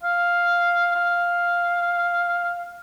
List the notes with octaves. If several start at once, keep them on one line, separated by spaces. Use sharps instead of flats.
F5
F5